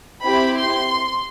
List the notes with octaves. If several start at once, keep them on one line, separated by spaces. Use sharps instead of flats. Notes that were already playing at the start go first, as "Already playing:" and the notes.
C4 E4 G4 B5
C6